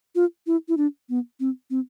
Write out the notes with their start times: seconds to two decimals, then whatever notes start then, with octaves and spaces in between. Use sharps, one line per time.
0.15 F4
0.47 E4
0.68 E4
0.77 D4
1.09 B3
1.40 C4
1.70 C4